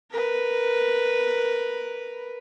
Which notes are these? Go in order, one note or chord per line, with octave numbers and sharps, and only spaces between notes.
A#4 B4